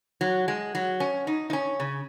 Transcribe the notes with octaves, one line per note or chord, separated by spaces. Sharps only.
F#3
G#3
F#3
C#4
D#4
D#4
C#4
C#3